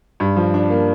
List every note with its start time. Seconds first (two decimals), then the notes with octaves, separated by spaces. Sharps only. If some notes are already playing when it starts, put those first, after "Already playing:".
0.20 G2
0.36 F3
0.54 D4
0.70 A#3